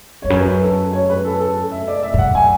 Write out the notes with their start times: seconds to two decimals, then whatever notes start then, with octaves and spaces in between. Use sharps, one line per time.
0.22 E2 C#5
0.30 F#2 B4
0.62 A4
0.93 C#5
1.10 B4
1.25 A4
1.40 A4
1.72 E5
1.88 D5
2.03 E5
2.14 G#2
2.18 F#2 F#5
2.35 G#5